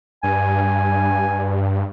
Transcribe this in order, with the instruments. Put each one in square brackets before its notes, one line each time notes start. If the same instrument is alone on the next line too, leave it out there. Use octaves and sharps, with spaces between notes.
[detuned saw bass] G2 [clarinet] G#5